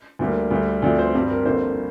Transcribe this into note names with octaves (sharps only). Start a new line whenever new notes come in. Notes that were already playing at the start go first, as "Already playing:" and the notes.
D2 D3 G3 A#3
D2 D3 G3
D2 D3 F3 C4 D5
C5
G2 G3 C4 G4
A#4
G1 F2 D3 A#3 C5